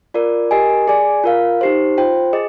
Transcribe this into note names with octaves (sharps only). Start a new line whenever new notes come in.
F4 A#4 D5
G4 A#4 D#5 G#5
G#4 D5 G#5
F4 A#4 F5
D#4 G4 C5
F4 C5 G5
G#4 D#5